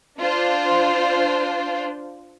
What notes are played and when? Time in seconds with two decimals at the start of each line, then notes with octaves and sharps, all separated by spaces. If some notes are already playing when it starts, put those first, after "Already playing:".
0.19 D4 F4 C5